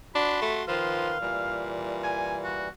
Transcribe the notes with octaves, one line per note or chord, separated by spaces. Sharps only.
D4 F#4 B5 C6
A3
D#3 F3 B4 F5 C6
A#2 E3 G3
G#5
F#4